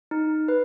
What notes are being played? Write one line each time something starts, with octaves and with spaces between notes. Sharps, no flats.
D#4
B4